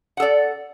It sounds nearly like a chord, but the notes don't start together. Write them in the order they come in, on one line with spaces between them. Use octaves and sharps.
F#5 A4 D5